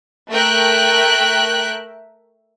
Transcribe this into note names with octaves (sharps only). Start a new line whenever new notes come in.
A3 A#4 E5 G5 F#6